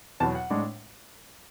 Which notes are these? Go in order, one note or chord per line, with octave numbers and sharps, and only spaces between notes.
E2 B2 F#3 B3 A5
F#5
A2 G#3 D4